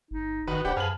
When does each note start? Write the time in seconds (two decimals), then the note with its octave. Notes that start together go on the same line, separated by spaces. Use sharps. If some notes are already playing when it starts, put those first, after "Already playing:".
0.11 G1 D#4
0.48 G1 D#3 F#4 B4
0.65 D1 D4 G4 C5 F#5 G5 B5
0.77 F#2 G#4 B4 F5 A5 F#7